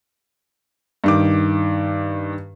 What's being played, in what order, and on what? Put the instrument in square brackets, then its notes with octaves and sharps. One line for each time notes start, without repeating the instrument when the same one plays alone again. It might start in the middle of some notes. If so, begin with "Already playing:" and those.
[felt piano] G2 D#3 D6